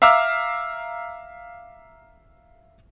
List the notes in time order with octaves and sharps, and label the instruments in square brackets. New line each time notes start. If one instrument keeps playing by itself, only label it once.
[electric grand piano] E5 F5 A#5 D6 E6 F6